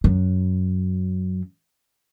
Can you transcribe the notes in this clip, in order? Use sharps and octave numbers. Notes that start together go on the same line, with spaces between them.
F#2 F#3